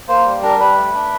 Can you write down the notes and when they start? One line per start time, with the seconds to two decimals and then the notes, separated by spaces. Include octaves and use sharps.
0.08 A#3 C5
0.25 G3
0.42 D4 A#4
0.59 G3 B4
0.77 A3
0.94 D4